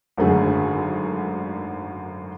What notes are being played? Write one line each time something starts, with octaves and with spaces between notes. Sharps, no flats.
G#1 F#2 D3 A3 G#4